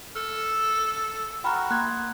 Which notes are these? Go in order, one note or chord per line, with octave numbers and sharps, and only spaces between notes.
A4 F6
F#4 G5 A#5 B5 F6
A#3 C6 F#6 G#6